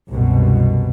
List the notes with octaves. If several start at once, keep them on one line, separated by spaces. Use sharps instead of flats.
C2 F#2 B2